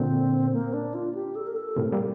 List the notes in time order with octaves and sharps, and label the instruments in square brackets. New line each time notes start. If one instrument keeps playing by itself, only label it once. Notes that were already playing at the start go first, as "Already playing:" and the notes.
Already playing: [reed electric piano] A#2 D3 [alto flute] C4
[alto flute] A#3
D4
F4
G4
A4
A#4
A4
[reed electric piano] A2 C3 [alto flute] A#4
[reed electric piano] G3 A#3